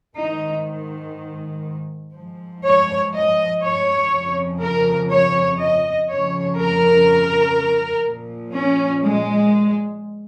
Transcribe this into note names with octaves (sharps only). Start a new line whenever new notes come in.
G#2 D#3 D#4
G#2 F3
C#5
D#5
C#5
F2 C#3 F3
A#4
C#5
D#5
F2 C#3 F3 C#5
A#4
A#2 F3
C#4
G#3